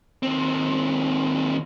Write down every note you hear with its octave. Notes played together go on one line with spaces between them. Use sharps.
D#2 C4